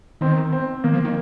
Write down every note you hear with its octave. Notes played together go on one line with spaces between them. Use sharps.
D#3 C4
C4
D#3 A#3
F3
D#3